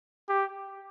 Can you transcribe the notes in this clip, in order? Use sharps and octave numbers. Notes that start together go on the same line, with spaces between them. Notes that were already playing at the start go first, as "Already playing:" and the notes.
G4